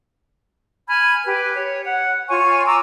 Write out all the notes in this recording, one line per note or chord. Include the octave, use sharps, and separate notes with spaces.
G#5 B5 F6 G#6
G4 B4
C#5
F#5
F4 C#5 G#5 C#6
A#5 D6 E6